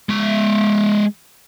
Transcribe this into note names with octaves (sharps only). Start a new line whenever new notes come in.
G#3 E5